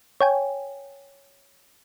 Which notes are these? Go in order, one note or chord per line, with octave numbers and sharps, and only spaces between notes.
C#5 G5 G#5